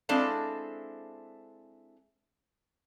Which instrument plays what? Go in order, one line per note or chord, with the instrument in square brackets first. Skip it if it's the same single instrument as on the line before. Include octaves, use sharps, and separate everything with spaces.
[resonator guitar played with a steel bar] G#3 C4 D4 E4 A4 F5